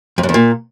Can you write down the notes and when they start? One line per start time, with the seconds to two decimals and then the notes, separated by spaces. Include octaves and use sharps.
0.18 F2
0.23 F#2
0.29 E2
0.34 A#2